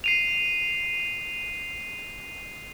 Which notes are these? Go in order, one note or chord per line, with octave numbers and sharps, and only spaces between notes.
C7 D#7 F7